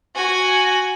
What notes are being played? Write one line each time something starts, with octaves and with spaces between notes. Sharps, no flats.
F#4 G#5